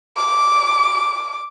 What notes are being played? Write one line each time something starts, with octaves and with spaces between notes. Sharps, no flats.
D6